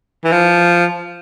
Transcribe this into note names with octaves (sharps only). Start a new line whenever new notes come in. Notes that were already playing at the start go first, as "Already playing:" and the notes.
E3
F3